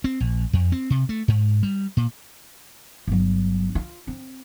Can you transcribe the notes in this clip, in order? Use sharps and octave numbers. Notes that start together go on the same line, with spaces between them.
C4
A#1
F2
C4
C3
A3
G#2
G3
A#2
G1 F#3
F4
C4